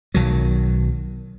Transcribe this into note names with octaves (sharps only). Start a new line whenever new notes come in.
B1 D#3 F#3